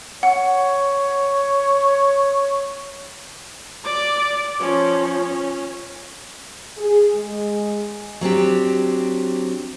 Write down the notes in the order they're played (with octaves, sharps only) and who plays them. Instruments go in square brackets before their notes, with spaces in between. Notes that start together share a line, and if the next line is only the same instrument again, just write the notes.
[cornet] C#5 [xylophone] F#5
[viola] D5 D6
F3 C#4
C#4
[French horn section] G#4
G#3
[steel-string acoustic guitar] F#3 C4 D4 G4